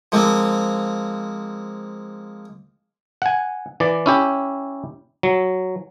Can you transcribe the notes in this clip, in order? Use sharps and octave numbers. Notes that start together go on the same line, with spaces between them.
F3 G#3 A#3 C4
F#5 G#5
E3 D5
C#4 E4 G4
F#3